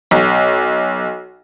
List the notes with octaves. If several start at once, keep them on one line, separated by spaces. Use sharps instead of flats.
B1